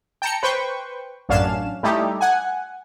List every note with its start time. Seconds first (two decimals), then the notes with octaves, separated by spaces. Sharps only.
0.22 G5 A5 A#5 C#7
0.43 B4 C5 G5 C#6
1.29 A1 F#2 C#4 D4 F5 E7
1.83 G3 A3 D#4 E4 G4
2.21 F#5 G#5